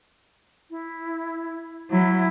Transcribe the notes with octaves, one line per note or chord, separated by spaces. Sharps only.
E4
F#3 E4